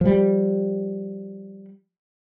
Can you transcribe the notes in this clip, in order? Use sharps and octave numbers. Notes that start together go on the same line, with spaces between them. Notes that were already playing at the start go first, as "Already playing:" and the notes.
F3 G3